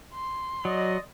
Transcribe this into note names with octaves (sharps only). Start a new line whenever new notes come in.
C6
F#3 D5 D#5